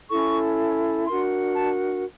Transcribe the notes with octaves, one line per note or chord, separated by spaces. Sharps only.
C#4 E4 A4 C#6
D4 F#4 A#4 C6
A5